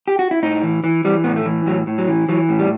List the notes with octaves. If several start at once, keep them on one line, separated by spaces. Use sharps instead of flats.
G4
F#4
E4
A2 D#4
E3
E3
E3 G3
A2 B3
A3
E3
A2 F#3
A2
F#3
E3
E3 F#3
A2
G3